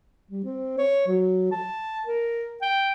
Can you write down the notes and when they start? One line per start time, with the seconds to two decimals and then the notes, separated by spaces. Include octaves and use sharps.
0.31 G3
0.44 C4
0.78 C#5
1.07 F#3
1.52 A5
2.06 A#4
2.62 G5